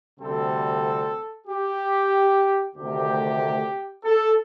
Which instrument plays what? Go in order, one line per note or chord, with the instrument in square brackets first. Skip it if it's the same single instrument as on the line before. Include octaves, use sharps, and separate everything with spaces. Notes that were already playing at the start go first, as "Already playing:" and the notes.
[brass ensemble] D2 C3 G3 C4 A4
G4
D2 C3 D#3 A3 G4
A4